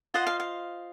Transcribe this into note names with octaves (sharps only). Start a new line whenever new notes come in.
F4 C5 D#5 F#5
F5
F5